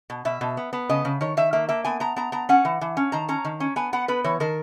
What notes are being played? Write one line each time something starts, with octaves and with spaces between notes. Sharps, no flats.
B2
B2 E5
B2
B3
B3
C#3 D#5
C#3
D#3 C#5
D#3 E5
A#3 E5
A#3 E5
B3 G#5
B3 A#5
B3 A#5
B3 A#5
C#4 F#5
E3
E3
C#4
D#3 A#5
C#4 A#5
D#3
C#4
B3 G#5
B3 F#5
B3 B4
E3 C#5
D#3 A#4